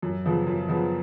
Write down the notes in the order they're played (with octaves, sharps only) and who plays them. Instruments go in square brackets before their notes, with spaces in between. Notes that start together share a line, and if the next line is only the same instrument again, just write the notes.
[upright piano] F#2
C#3 F3 B3
F#2
C#3 F3 B3